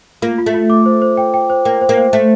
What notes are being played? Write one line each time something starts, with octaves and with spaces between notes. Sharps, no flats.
A#3 F4
F4
A3
F4
D6
C5
C5
G5
G5
C5
A#3 G5
C5
A#3
C5
A3 C5